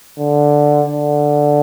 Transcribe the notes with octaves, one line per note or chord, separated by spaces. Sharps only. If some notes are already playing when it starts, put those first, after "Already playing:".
D3
D3